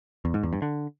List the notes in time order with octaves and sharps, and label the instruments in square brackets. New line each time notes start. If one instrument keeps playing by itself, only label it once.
[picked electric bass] E2
G#2
E2
G2
D3